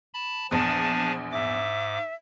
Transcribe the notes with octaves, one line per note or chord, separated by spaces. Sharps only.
A5 B5
A#1 E2 F3 D4 G#5 A5
G#2 E5 D6